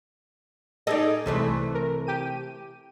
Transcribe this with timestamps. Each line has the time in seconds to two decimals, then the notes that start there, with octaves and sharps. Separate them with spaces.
0.87 D#4 G#4 A4 D5 D#5
1.26 C2 C3 E3 A3 C5
1.74 A#4
2.07 G4 D#7